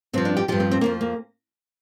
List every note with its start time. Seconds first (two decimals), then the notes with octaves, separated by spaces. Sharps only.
0.13 G2 F3 C4
0.25 D4
0.37 G4
0.48 G2 F3 G4
0.60 C4
0.71 C4
0.81 F2 F3 A#3
1.01 A#3